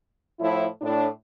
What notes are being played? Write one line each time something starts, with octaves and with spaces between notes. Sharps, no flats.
A2 F3 E4
A2 D4